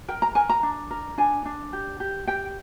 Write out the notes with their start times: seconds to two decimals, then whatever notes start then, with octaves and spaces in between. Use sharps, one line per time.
0.08 A#4 G5
0.22 A#5
0.35 A#4 G#5
0.49 A#5
0.63 D4
0.91 A#4
1.18 D4 G#5
1.45 D4
1.73 G4
2.00 G4
2.27 G4 G5